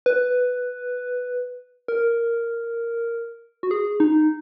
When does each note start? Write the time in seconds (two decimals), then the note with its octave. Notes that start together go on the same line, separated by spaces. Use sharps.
0.06 B4
1.88 A#4
3.63 F#4
3.71 G#4
4.00 D#4